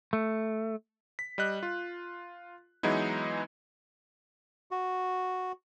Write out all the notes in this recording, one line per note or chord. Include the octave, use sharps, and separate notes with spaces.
A3
B6
G3 D#5 F#6
F4
E3 F#3 G#3 B3 D#4 E4
F#4